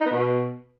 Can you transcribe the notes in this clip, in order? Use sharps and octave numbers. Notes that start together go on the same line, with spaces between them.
D#4
B3
B2